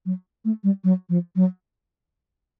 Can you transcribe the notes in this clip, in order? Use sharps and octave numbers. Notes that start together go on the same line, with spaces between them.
F#3
A3
G3
F#3
F3
F#3